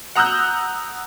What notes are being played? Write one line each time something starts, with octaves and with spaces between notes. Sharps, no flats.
F#5 A#5 D#6 E6 F#6 G6